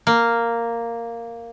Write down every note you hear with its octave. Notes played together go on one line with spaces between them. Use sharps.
A#3